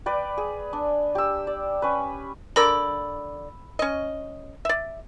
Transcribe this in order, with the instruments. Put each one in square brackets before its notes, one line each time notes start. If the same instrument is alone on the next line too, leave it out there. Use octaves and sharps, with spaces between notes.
[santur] B4 D5 G5
G#4
D4
G4 E6
D5
C#4 B4
[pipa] D3 A#4 D5 [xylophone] B5 E6
[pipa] C#4 D#5
D5 E5